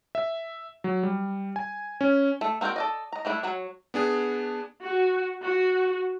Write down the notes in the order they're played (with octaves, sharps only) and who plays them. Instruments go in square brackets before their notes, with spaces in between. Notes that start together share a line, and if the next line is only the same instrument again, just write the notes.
[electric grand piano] E5
F#3
G3
G#5
C#4
[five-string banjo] A3 A4
A#3 C4 F#4 A4 G5
A4 D5 D#5
D#5 A#5
G3 A3 D4 E4
F#3 F#4 C#5
[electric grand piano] B3 D4 G#4
[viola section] F#4
F#4